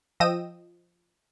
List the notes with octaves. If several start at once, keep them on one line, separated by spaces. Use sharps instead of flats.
F3 D#5 G5 E6 A#6 D#7